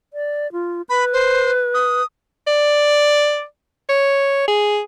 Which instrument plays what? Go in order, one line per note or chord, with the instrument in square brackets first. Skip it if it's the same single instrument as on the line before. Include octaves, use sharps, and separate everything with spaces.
[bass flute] D5
F4
[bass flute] B4 [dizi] B5
[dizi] C5
D#6
[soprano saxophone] D5
C#5
G#4